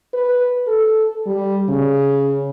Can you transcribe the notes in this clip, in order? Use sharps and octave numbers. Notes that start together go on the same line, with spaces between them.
B4
A4
G3
C#3